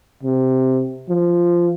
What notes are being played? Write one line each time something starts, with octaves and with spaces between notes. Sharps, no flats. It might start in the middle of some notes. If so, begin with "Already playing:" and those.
C3
F3